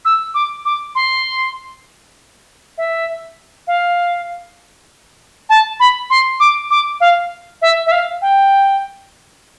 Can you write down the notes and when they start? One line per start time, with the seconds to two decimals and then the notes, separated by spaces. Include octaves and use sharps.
0.05 E6
0.34 D6
0.65 D6
0.95 C6
2.78 E5
3.67 F5
5.50 A5
5.80 B5
6.10 C6
6.40 D6
6.71 D6
7.01 F5
7.62 E5
7.86 E5
7.92 F5
8.22 G5